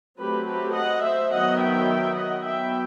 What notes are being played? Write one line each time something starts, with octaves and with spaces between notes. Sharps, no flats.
F#3 A3 C4 G4 B4
G4 B4
D#5 F#5
C5 E5
D#3 F#3 B3 D#5 F#5
E5 G5
D#5 F#5
F#3 B3 E5 G5